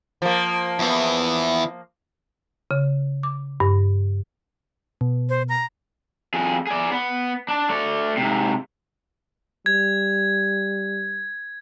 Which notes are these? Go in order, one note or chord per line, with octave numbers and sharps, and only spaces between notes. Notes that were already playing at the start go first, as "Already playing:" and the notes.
F3 A#3
E2 E3
C#3
D6
G2
B2
C5
A#5
F2 G#4
G#4 D5
B3
D4
A3 D5
G#2 C3
G3 G#6